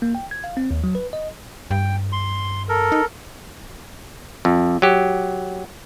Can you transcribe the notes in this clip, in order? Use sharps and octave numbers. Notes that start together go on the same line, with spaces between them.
A#3
G5
G#6
F5
C4
D#2
F#3
B4
D#5
G2 G5
C6
A4 A#4
D#4
F2
F#3 G4